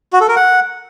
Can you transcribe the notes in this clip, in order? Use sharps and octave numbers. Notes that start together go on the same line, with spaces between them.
F#4
A4
A#4
F#5